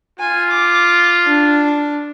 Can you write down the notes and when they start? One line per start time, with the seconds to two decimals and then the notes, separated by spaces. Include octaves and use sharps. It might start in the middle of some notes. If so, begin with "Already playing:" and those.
0.20 F4 G#5
0.51 D6
1.26 D4